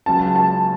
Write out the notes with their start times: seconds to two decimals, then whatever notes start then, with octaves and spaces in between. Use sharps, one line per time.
0.06 C#2 C#3 F#3 A5
0.36 A5